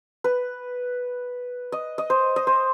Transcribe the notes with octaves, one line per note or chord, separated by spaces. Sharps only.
B4
D#5
D#5
C5
D#5
C5